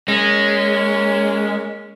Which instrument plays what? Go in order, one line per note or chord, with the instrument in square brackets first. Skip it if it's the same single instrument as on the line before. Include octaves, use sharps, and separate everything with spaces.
[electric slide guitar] G#3 [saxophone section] A#3 C#4